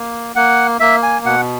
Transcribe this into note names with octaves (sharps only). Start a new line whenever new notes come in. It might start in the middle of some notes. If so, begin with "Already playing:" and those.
Already playing: A#3
A#3 F#5
A#3 E5
G#5
B2 F#5